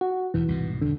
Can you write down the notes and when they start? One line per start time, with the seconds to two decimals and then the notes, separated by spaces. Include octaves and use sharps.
0.01 F#4
0.34 E1 D#2 E3
0.48 C2 G#2 B2
0.81 D#1 E2 D3